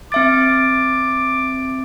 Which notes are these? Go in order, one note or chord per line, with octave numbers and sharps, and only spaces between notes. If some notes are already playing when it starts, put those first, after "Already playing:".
C4 E5 D6 A6